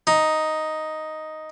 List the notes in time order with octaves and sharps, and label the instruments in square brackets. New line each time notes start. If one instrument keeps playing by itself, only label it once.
[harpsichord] D#4